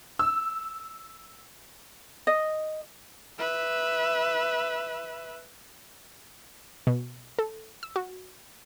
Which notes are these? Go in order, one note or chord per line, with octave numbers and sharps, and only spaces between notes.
E6
D#5
B4 E5
B2
A4
E6
F#4